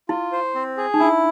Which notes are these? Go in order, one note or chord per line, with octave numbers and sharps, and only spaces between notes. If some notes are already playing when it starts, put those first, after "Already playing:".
E4 F4
C5
C4
G#4
D#4
D4 E4